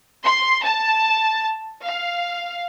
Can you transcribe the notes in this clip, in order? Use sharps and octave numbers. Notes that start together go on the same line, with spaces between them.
C6
A5
F5